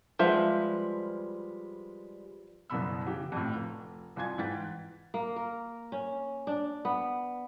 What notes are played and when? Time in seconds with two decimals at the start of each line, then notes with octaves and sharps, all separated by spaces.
0.19 F3 G3 G#3 B4 C5 E5 F#5
2.70 F#1 C2 F#2 B2 B5 E6
3.07 C#3 E3 G4
3.32 F2 A2
3.56 F1
4.16 C2 F2 F4 G#5 G#6
4.38 G#2 E3 B4 G5 A6 B6
5.14 A#3
5.36 A#4
5.92 C#4
6.47 D4
6.85 B3